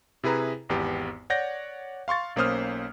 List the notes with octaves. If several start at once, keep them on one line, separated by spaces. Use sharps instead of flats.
C3 E4 G#4 B4 A#5
G#1 E2 B3 G4
C#5 D5 F#5 G6 A#6
F5 C6 C#6 A6
B1 A#3 C#4 C5 D#6 F6